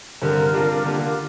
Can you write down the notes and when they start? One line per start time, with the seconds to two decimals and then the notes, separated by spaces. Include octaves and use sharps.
0.22 G2 D3 G3 C4 A#4
0.52 C3 G3 D4 F4
0.84 D3 A#3 D4 F4 G4
1.00 A#4